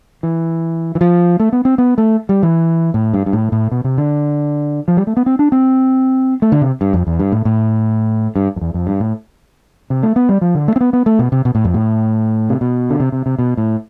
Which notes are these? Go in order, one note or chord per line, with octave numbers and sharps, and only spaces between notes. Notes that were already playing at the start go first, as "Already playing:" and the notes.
E3
E3
F3
A3
B3
C4
B3
A3
G3
E3
A2
G2
G2
A2
A2
B2
C3
D3
F3
G3
A3
B3
C4
D4
C4
A3
D3
C3
G2
F2
E2
G2
A2
A2
G2
F2
E2
F2
G2
A2
C3
A3
B3
G3
F3
D3
A3
C4
B3
B3
A3
B2
C3
B2
A2
F2
A2
C3
B2
D3
C3
C3
C3
B2
A2